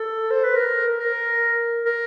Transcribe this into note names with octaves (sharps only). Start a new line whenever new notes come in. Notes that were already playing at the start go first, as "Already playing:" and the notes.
Already playing: A4
C5
B4
A#4
A#4
A#4